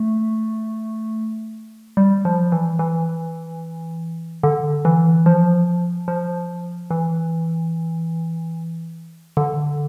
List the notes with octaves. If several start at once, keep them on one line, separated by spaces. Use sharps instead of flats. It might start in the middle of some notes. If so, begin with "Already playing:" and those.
Already playing: A3
G3
F3
E3
E3
D3
E3
F3
F3
E3
D3